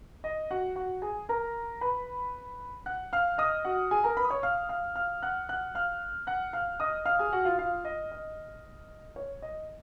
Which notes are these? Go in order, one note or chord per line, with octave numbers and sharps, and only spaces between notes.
D#5
F#4 F#5
F#4 F#5
G#4 G#5
A#4 A#5
B4 B5
F#5 F#6
F5 F6
D#5 D#6
F#4 F#5
G#4 G#5
A#4 A#5
B4 B5
D#6
C#5 C#6
F5 F6
F5 F6
F5 F6
F#5 F#6
F#5 F#6
F5 F6
F#5 F#6
F5 F6
D#5 D#6
F5 F6
G#4 G#5
F#4 F#5
F4 F5
F4 F5
D#5
D#5
C#5
D#5